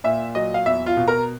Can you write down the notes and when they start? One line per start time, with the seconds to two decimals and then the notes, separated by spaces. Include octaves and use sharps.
0.04 A#2 E5
0.35 F#3 D#5
0.54 F5
0.66 E2 E5
0.86 F4 F5
0.97 B2
1.08 A#4 A#5